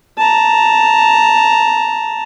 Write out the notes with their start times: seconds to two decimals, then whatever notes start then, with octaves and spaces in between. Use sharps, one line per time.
0.19 A5 A#5